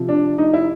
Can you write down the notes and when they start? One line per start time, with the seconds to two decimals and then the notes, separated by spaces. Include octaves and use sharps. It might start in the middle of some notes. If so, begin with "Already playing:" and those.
Already playing: C3 F3
0.09 D4
0.38 D#4
0.53 E4